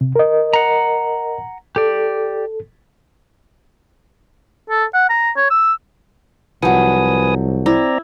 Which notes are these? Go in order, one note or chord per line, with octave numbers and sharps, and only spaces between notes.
C3
A#4 D#5
F#5 A#5
G4 A4 D5
A4
F#5
A#5
C#5
E6
C2 F3 F#3 B4 G#5 D#6
C4 E4 D5 A#5